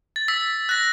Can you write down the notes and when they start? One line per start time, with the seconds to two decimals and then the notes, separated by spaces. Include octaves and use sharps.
0.16 A6
0.28 E6 B6
0.69 F#6 A#6